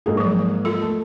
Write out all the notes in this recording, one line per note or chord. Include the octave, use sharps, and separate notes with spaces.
G#2 A#3 G#4
F3 F#3
F4 A4
A3